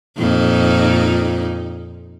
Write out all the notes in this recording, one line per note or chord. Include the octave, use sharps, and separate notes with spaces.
F2 A#2 D#4